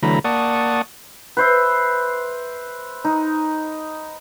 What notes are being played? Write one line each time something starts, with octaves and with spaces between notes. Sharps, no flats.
D3 E3 F#3 A3 A#5 B5
A#3 D5 F#5 A5 C#6 D#6
B4 C5 E5
D#4